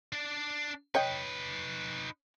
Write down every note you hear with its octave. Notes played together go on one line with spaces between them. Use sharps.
D4 D5
D#4 B4 C#5 D#5 G5